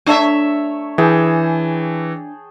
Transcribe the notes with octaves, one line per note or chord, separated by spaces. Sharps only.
A3 D4 C#5 E5
E3 G#4 G5 A5